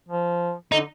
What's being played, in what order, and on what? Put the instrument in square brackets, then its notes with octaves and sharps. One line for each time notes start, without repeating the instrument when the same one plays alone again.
[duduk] F3
[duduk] D3 [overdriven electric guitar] D#4